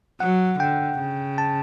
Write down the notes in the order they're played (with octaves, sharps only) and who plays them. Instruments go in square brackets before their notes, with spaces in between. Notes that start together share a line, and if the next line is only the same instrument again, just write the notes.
[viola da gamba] F#3 [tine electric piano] F#5
[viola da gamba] D3 [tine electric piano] G5
[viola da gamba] C#3
[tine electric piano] A5